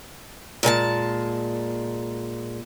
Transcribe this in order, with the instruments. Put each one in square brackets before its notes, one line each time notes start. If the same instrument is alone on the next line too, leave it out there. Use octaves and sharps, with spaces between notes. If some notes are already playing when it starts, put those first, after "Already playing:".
[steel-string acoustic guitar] A#2 G#3 G#5 A5